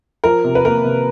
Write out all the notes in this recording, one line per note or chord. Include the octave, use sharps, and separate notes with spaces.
F3 A#4
C3
B4
A#3 A#4
C3